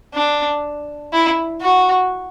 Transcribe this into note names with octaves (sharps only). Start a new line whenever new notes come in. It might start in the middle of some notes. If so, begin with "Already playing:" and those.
D4
E4
F#4